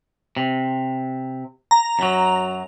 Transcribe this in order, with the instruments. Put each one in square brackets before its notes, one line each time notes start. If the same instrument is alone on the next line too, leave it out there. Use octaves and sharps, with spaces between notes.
[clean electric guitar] C3
[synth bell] A#5
[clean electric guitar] F#2 F#3